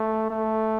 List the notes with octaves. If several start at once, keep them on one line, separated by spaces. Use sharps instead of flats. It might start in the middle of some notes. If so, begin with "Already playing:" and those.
Already playing: A3
A3